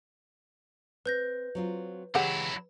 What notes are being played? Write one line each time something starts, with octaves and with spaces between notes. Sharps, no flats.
C4 B4 G6 A#6
F#3 C4 F4
C#3 E3 F#3 G#3 E4 G4 F#5